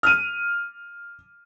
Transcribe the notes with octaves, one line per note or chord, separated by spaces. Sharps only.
F6 D#7